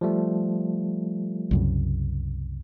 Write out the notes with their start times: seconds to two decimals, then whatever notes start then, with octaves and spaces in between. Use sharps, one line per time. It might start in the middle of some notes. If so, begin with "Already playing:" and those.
0.01 F3 G3 A3
1.51 C2 F#2 C#3